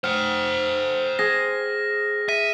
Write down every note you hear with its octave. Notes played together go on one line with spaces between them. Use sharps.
C5 F#5 G5 F6
G#4 A#6
E5 D#7